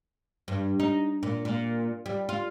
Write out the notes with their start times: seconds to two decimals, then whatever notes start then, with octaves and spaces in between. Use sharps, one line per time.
0.48 G2
0.80 D#4
1.23 A#2
1.45 A#2
2.06 G3
2.29 F4